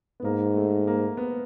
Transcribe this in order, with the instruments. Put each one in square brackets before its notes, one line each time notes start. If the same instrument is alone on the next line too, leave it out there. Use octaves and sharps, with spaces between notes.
[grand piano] B3
[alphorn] G#2 [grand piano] A#3
[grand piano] A3
A#3
B3